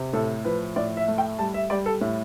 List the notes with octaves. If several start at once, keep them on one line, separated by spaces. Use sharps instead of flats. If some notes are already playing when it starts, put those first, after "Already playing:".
Already playing: C3
A2 A4
F3 B4
A2 D5
E5
A3
G5
G3 A5
E5
G3 D5
A4
A2